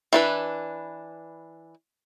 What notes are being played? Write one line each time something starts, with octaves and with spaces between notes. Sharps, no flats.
E3 D4 B4